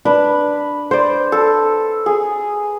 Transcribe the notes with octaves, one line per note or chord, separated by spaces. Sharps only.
D4 B4
C5 D5
A4
G#4